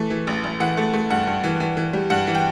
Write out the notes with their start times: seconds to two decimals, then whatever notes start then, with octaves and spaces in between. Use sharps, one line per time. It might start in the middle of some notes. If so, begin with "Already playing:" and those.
Already playing: E3 A3
0.10 E3
0.27 A1
0.44 A1
0.60 E3 F#5
0.77 A3
0.93 A3
1.10 G2 F#5
1.27 G2
1.44 E3
1.60 E3
1.77 E3
1.93 G3
2.10 G2 F#5
2.27 E3
2.35 G5